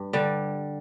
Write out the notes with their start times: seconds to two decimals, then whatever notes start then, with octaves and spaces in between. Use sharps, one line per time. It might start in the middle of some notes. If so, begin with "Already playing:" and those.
Already playing: G2
0.13 D3 G3